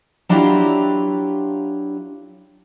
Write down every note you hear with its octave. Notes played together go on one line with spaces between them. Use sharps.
F#3 D4 E4 F4 G4 A#5